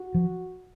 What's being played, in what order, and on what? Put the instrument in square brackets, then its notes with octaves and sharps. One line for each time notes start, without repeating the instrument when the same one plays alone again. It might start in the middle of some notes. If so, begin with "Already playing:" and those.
Already playing: [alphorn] F#4
[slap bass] F3